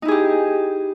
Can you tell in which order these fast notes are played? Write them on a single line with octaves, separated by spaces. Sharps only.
D#4 E4 G#4 G4